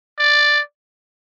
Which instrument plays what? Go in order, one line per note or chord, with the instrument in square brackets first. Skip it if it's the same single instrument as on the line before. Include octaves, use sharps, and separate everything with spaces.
[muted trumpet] D5